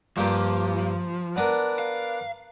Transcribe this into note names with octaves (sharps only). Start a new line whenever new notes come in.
G2 F3 A#3 G4
B3 D4 A#4
F5